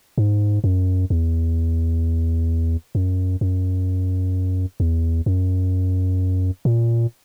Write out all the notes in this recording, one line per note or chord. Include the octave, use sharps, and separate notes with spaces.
G#2
F#2
E2
F#2
F#2
E2
F#2
A#2